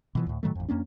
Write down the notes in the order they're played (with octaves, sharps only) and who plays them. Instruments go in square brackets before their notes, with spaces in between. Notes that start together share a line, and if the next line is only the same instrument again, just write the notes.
[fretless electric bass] B2 E3 F3
D2 A2
A2 D#3 F#3 A3
A1 F2
F2 A#3 C#4 D4